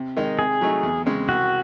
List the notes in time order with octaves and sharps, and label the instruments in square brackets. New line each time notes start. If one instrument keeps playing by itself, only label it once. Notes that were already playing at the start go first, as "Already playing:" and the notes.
Already playing: [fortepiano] C3
D#3 G#3 D#4
[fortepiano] C3 [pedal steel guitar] G#4
[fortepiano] F#3 A3 D#4
E2
C#3 G#3 C4
[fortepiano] C2 [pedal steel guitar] F#4